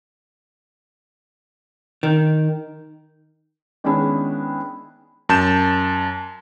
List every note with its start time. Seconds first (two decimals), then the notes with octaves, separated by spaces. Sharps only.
2.03 D#3
3.84 D#3 G#3 B3 C#4 D4 E4
5.29 F#2 A5 G6 E7